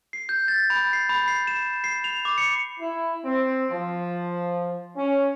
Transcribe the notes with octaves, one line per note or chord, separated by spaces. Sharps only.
C7
G6
A6
B5
C7
B5
C7
E7
C7
F7
D6
C#7
E4
C4
F3
C#4